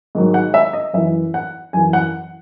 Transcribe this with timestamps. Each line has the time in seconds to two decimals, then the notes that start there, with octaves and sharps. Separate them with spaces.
0.15 G#2 D#3 F#3
0.34 F#5
0.54 E5
0.73 D#5
0.93 F#2 E3 E5
1.34 F#5
1.73 F#2 E3 G#5
1.93 F#5